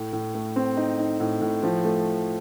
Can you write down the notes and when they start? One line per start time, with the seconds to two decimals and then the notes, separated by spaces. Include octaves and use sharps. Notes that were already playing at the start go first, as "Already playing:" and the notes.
Already playing: A2
0.13 A2
0.34 A3
0.56 C4
0.77 D#4
0.99 D#4
1.20 A2
1.42 A2
1.63 F3
1.85 A3